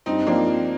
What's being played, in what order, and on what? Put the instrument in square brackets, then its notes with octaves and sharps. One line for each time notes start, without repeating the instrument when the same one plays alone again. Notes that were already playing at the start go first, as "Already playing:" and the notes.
[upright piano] G2 [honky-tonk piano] C4 D#4
[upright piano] F3 C4 F4 [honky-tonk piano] A#3 D4